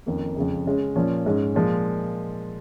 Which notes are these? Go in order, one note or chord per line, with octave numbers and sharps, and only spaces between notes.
F2 D#3 A#3 C#4
F2 C#3 G#3
C#3 G#3 C#4
A#2 F3 C#4
G#2 G#3 C#4
A#2 F3 G#3